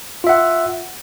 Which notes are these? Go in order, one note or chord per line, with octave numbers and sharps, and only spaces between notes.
F4 E5 F#5